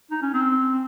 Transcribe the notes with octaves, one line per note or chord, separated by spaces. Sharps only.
D#4
C#4
C4